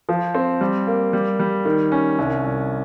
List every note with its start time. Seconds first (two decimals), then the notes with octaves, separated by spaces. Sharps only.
0.09 F3
0.34 C4
0.61 G3
0.87 A#3
1.13 G3
1.39 G3
1.65 D#3
1.92 C#4
2.18 C2
2.44 C2